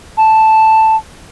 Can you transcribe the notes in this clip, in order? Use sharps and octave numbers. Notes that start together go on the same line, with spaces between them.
A5